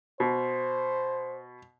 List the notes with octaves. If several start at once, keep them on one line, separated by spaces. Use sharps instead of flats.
B2 C5